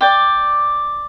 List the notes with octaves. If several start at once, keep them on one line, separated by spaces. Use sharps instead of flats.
D5 G5 D6